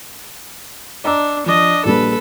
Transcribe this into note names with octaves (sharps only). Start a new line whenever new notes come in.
D4 D#5 A#5 E6
F3 D4 D#5
A#1 G3 A#3 A4 B4